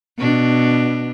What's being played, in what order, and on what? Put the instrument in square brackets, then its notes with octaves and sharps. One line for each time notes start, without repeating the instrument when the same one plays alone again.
[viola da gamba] B2 D4